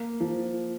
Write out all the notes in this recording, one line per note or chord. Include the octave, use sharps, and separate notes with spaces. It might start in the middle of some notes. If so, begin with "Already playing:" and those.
Already playing: A#3
F3